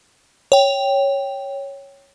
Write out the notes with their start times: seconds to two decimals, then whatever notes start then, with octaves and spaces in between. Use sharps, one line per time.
0.52 C#5 G5